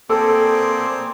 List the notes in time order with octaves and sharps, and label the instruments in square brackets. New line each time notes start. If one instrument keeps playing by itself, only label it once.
[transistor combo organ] A#3 C5 D5 [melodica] C4 G#4 [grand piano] A4